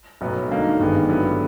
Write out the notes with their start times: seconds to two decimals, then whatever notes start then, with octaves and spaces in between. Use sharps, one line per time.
0.21 B1 A2 F#3 B3
0.50 D3 F#3 A#3 D#4
0.79 G#1 G2 D#3 G#3 B3
1.08 G2 D3 F#3 B3 E4